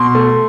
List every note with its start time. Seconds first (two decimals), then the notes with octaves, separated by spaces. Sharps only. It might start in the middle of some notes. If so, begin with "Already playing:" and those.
Already playing: B2 C6
0.15 A3